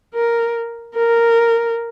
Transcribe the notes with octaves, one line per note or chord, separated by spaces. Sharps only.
A#4
A#4